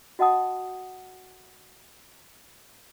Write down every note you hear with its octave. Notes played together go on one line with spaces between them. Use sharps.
F#4 D#5 F#5 A5 D#6